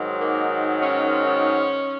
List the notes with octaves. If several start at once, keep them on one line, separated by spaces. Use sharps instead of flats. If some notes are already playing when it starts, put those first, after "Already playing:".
Already playing: G#2 D#3 F#3
A#3
C#4